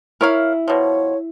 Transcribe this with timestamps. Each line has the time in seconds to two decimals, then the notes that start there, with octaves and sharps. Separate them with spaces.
0.21 E4 A#4 C#5 F5
0.68 B2 F3 C#5